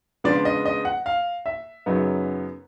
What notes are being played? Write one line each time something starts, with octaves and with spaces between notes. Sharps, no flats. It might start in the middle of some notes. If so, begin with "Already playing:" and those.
C#3 F3 G#3 B3 D4 D5
D#5
D#5
F#5
F5
E5
F#2 C#3 F#3 B3 D#4